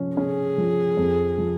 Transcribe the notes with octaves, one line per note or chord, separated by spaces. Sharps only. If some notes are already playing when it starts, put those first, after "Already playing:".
Already playing: F3 C#4
C#4 G#4
F3
F2
F3